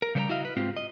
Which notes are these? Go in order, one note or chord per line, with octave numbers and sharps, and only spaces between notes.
A#4
C#3 G3 A4 C5 G5 A#5
E4 F#4 D#5 F5
B4
G#2 G#3 C4 F4 G4
D#5